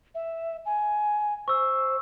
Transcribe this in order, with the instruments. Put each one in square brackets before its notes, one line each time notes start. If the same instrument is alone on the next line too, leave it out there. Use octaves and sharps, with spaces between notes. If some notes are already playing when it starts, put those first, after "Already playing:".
[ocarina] E5
G#5
[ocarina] C5 [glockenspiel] C#6 E6